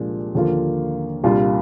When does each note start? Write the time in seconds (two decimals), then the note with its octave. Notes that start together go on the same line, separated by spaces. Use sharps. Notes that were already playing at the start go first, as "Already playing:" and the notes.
Already playing: C2 A#2 F3 G#3 D4
0.35 D#2 D3 F3 A#3 F4
1.23 C2 A#2 G3 D4 F4